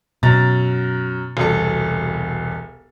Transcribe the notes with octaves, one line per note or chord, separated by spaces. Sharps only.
F#2 B2 A#5 A6
E1 C2 A4